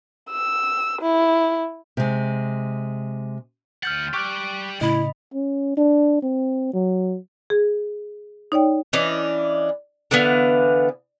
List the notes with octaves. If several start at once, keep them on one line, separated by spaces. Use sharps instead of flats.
E6
E4
C3 G#3
D2 F#5 F6 G6 A6
G4 D5 C#6 D6 F#6
A2 C#3 E4 D#5 B5
C#4
D4
C4
F#3
G#4
D#4 C#5 D5 G5
E3 C#4 D4 D#5
D3 E3 B3 F5